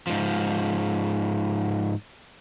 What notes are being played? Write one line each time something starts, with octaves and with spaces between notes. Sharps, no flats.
G#2 F3